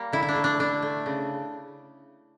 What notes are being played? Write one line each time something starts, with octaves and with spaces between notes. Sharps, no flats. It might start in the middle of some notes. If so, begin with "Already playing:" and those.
Already playing: G3 A#3
D3 E4
E4
D4
A3
D4
D3 D4
A3
C#3